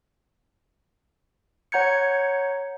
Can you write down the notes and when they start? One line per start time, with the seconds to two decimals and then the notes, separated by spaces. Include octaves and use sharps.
1.72 C#5 F#5 A#5 G6 G#6 C#7